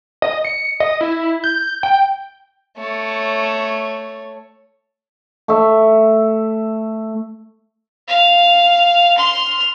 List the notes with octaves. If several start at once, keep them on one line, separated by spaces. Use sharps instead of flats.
D#5
C#7
D#5
E4
G6
G5
A3 C#5
A3 E5
F5
C6 F6